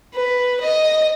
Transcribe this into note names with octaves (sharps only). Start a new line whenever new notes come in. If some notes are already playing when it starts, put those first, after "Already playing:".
B4
D#5